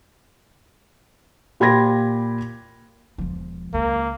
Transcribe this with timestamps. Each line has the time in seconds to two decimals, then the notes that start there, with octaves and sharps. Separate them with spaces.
1.60 A#2 G4 B5 C6 G#6 A#6
3.18 E1 F3
3.74 C#2 A#3